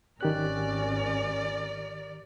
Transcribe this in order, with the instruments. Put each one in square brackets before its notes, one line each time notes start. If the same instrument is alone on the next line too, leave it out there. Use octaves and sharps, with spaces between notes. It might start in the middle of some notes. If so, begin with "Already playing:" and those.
[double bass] G#1 C#4 [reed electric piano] D#3 G4 F#6 [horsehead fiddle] A#4 D5